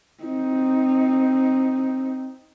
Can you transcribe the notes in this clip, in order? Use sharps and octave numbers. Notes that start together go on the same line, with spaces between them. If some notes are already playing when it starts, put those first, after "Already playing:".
C4 D#4